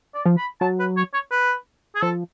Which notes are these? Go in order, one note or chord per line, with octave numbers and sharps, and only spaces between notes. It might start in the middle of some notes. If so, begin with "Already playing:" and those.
D5
F3
B5
F#3 A5
B4
C#5
C#5
B4
G#4
F3 A4